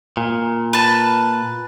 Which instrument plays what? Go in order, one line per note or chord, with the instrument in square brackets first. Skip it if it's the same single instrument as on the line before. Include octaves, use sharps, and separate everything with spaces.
[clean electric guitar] A#2
[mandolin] B4 A5